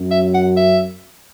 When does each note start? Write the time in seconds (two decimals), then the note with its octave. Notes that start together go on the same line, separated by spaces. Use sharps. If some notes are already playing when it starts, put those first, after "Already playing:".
Already playing: F#2
0.11 E5
0.34 F#5
0.57 E5